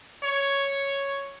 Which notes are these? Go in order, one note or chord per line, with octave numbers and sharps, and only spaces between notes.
C#5